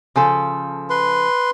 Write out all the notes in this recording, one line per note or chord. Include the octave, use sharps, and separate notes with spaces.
C#3 F3 A4
B4 C6